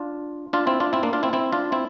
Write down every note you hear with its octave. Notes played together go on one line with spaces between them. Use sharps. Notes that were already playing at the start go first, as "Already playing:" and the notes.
Already playing: D4 F4
D4 F4
C4 E4
D4 F4
C4 E4
A#3 D4
D4 F4
C4 E4
C4 E4
D4 F4
C4 E4